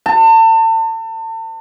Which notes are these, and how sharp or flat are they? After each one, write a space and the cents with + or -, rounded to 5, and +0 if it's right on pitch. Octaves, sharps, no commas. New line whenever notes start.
A5 +35